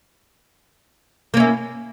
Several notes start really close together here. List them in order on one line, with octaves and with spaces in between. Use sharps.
A#3 C#4 E4